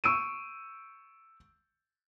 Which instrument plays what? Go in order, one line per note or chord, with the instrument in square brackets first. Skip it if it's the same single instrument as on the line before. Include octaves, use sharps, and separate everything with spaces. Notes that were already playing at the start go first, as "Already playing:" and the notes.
[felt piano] C#6 E6 D7 D#7